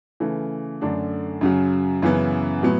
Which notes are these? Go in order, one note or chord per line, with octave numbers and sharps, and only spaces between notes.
C#3 E3 A3
F#2 D3 A3 D4
F#2 C#3 F#3
F#2 C#3 E3 B3
A2 F#3 B3